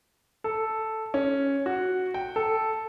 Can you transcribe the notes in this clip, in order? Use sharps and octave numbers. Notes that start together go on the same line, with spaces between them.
A4
C#4
F#4
G5
A4